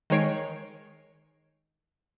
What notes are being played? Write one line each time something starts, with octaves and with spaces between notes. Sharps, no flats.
D#3 G#3 C#5 C7 D7